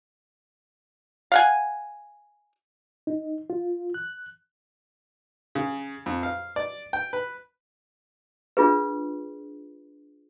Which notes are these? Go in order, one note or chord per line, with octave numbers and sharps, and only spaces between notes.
F5 F#5 G#5
D#4
F4
F#6
C#3
F2
F5
D5
G5
B4
D4 F4 G#4 B4